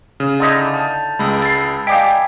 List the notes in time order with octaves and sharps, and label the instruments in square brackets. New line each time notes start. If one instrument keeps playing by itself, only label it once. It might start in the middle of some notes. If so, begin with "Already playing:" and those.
[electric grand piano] C#3
[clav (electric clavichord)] D3 D#4 E4 [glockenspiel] A6 F7
[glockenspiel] A5 G6 A6
[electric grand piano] C#2 G#3 [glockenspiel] B5 E6
[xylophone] A6 C7
[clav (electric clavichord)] G4 D5 D#5 [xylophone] F5 G5 [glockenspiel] G#5 G#6 [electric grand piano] B6